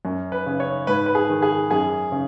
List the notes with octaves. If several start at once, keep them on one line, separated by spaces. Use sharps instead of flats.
F#2
B4
C#3
C#5
G#2 B4
B4
G#4
D#3
G#4
F#2 G#4
C#3